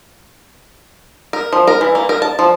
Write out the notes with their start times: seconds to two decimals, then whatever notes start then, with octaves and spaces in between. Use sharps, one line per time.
1.33 A#4
1.53 F3
1.67 A#4
1.81 E3
1.95 A#3
2.09 A#4
2.22 A5
2.39 F3